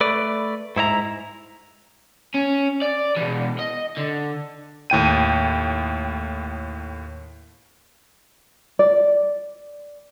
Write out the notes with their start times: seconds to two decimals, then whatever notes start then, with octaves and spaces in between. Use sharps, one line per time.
0.01 A3 B4 D5
0.76 G#2 E4 C5 A#5
2.35 C#4
2.82 D5
3.16 B2 E3
3.59 D#5
3.98 D3
4.90 D#2 A2 G5 D#7
8.79 D5